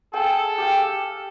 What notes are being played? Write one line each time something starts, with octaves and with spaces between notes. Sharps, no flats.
G#4 A4 F5 G5
G4 F5 G5